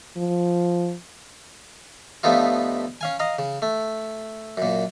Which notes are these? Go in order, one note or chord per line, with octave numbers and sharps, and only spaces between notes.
F3
G2 F3 A3 B3 D#4 F4
C#4 F5 G#5
D#5 F5 A#5
C#3
A3
F#2 A#2